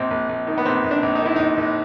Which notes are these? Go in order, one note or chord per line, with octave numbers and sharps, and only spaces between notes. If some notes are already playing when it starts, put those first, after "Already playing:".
Already playing: A#1 C4
A#1
A#1
D#3
B3
A#1 C4
A#1
D4
A#1
D#4
D#3 E4
A#1 D#4
A#1